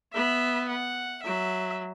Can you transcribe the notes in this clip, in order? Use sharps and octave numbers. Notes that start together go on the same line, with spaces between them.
B3 E5
F#5
F#3 E5